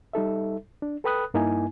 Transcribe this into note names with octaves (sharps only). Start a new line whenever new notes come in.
G3 D#4 A4 E5
D4
A4 B4 G5 B5 D#6 F#6
G2 A#3 D#4 E4 G#5